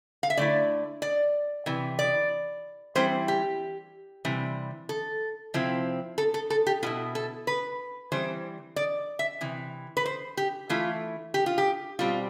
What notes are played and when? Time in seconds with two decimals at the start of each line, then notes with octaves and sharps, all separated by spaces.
0.23 F5
0.30 E5
0.37 D3 A3 E4 D5
1.02 D5
1.66 C3 E3
1.99 D5
2.95 E3 G3 C4 E4 C5
3.28 G4
4.25 C3 E3 G3
4.89 A4
5.54 C3 F3 C4 E4
6.18 A4
6.34 A4
6.50 A4
6.67 G4
6.83 B2 B3 E4 F4
7.15 A4
7.47 B4
8.12 E3 G3 C4 C5
8.76 D5
9.19 E5
9.41 C3 E3
9.97 B4
10.06 C5
10.37 G4
10.69 E3 A3 E4 F4
11.34 G4
11.46 F4
11.58 G4
11.99 B2 G3 C4 F4